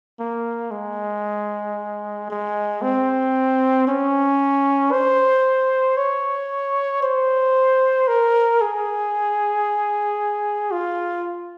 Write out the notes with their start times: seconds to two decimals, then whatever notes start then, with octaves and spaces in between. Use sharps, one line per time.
0.20 A#3
0.71 G#3
2.30 G#3
2.82 C4
3.87 C#4
4.93 C5
5.97 C#5
7.03 C5
8.08 A#4
8.61 G#4
10.72 F4